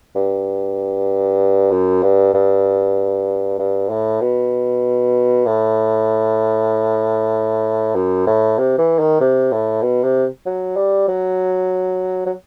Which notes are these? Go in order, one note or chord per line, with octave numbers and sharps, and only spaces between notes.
G2
F#2
G2
G2
G2
A2
B2
A2
F#2
A2
C3
E3
D#3
C3
A2
B2
C3
F#3
G3
F#3
F#3